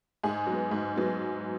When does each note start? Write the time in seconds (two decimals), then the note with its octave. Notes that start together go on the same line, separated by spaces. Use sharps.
0.24 G#2 G#4
0.47 F#3
0.52 B3
0.71 G#2
0.96 F#3 B3